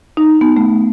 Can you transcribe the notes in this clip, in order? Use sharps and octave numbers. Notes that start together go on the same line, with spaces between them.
D#4
B3
A3